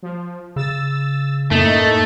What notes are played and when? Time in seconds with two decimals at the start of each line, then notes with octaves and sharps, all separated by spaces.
0.02 F3
0.56 C#3 E6 A6
1.51 F#2 A2 A3 A#3 D#4